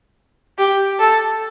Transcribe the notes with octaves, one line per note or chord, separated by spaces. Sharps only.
G4
A4